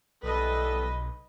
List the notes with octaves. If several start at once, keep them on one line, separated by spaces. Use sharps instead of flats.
B1 E3 G3 A4 B4 D#5